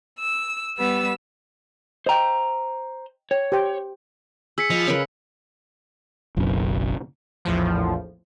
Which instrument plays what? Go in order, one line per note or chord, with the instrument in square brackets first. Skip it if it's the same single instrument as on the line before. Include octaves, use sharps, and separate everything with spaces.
[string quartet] E6
G3 B3 E6
[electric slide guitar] C5 A#5 [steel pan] D#5 G5
[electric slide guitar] C#5 [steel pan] G5
[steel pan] G4 C5 G5
[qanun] G#4 [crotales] E6 B6 C#7
[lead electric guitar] F3 [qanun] D#5 B5
[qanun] C#3 A#4 B4
[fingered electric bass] F#1 B1 F#2
[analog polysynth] A#1 E2 A2 F3